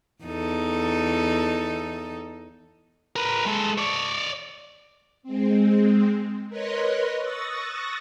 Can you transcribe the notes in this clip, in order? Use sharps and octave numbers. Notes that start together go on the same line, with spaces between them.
E2 D#4 A4
A#4 B4
G#3 A4
C#5 D5
G#3 C4
A#4 B4 C#5 D#5 C6 F#6
C#6 D#6 E6 F#6 A6 A#6